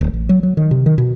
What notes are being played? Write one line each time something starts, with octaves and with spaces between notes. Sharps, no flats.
D1
A1
F#3
F#3
D#3
C3
D#3
B2